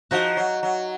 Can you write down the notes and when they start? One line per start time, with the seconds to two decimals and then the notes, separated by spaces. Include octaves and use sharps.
0.11 F3 D#4 F#4
0.37 F#3
0.63 F#3